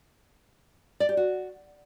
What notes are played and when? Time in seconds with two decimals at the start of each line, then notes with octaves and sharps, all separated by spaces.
1.00 D5
1.09 G4
1.17 F#4